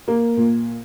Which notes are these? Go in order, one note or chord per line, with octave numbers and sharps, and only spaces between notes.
A#3
A#2